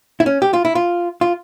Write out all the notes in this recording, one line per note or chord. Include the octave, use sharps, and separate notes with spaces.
E4
C#4
G4
F4
E4
F4
F4